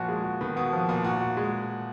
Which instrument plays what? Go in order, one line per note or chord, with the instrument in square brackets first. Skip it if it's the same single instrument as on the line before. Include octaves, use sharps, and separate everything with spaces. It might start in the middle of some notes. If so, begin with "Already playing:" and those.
Already playing: [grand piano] A#2 [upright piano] F3 F#4
[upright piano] G#3
F#4
[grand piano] D#3 [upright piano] B3
[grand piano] B2 [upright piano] B3
[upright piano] F3
[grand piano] A#2 [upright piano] B3
[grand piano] A#2 [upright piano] F#4
[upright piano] F#4
G#3